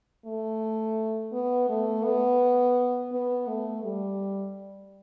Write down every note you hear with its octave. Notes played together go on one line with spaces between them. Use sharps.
A3
B3
A3
B3
B3
A3
G3